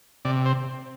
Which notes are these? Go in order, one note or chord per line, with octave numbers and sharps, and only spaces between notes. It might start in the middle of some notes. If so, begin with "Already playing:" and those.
C3 D5
C5